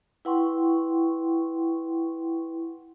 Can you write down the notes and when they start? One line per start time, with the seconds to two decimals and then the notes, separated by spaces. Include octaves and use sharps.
0.25 E4 B4 F#5 G5 C6 C#6